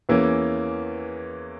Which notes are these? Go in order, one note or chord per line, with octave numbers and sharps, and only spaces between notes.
E2 E3 A#3 C#4